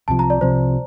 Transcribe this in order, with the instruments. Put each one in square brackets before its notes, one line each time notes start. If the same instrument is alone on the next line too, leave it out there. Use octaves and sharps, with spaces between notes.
[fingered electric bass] C2 C3 F3 [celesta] A5
[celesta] A#5
D5
[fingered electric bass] C2 C3 F3 [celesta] C5